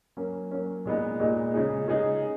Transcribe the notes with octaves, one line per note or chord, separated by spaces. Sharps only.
F#3 A#3 C#4
F#3 A#3 C#4
A#2 G#3 B3 D#4
A#2 G#3 B3 D#4
C#3 G#3 D#4 G#4
C#3 G#3 D#4 G#4